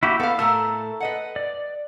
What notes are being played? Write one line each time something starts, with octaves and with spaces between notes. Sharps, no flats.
A#3 E4 F#4 G4
B3 A4 F5
A2 A3 A4 A#4 E6
B4 D#5 F#5
D5